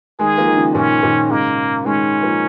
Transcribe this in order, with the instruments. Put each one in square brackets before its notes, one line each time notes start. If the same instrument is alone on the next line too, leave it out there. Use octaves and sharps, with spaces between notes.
[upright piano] D#3 G#3 [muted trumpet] G#4
[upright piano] F3 A#3
D#3
C#3 F3
[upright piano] A#2 D#3 [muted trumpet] C#4
[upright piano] A#2 D#3
[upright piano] G#2 C#3 [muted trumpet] A#3
[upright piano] D#3 G#3 [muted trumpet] C#4
[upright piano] F3 A#3